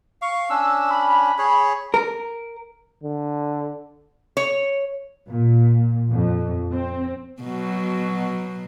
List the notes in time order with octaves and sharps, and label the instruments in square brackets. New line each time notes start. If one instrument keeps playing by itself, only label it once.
[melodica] F5 [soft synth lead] C#6
[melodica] C#4 D4 [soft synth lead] E6
[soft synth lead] B5
[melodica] G#4 C#5
[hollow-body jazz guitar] A#4
[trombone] D3
[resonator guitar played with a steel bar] C#5
[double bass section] A#2
F2
C4
[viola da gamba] B2 F#3